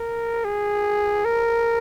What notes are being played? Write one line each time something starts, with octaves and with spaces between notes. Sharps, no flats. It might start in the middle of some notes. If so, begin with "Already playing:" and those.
Already playing: A#4
G#4
A#4